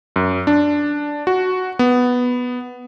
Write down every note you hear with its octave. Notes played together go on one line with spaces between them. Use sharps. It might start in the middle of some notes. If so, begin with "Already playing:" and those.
F#2
D4
F#4
B3